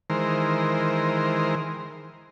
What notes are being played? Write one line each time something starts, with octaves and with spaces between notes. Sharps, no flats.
D#3 E3 G#3 A#4 C5